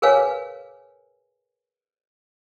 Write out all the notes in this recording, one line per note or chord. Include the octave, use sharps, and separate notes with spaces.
G#4 A#4 B4 C#5 F5 G#5